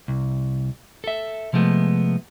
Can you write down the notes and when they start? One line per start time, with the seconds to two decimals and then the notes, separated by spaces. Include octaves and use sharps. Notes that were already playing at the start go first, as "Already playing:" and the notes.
0.08 C2
1.04 A4 E5
1.53 C3 F3 G#3 A3 B3